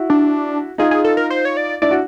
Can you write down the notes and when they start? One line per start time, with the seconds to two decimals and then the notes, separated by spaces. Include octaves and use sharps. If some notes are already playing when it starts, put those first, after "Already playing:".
Already playing: E4 F#4
0.10 D4
0.78 D#4 F4 G#4
0.91 G#4
1.04 A4
1.17 A#4
1.30 C5
1.45 C#5
1.57 D5
1.82 D4 E4 D5
1.91 F#4